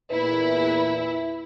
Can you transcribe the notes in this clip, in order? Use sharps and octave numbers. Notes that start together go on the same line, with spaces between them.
E2 A#2 E4 B4